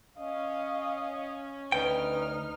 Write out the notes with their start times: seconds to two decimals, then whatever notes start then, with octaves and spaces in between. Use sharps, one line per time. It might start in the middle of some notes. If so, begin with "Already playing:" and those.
0.19 C#4 D#5 F5
1.72 D2 D#4 B4 G5 F6